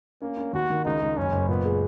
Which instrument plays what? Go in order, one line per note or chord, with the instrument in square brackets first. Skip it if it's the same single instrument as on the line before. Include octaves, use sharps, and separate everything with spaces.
[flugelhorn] A#3 [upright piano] C#4
[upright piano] C#4
[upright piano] D#2 [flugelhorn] F#4
[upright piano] D#3
[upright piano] C#2 [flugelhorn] D#4
[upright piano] C#2
[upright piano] F#1 [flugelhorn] C#4
[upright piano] F#1
[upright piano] A#2 [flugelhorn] B3
[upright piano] G#3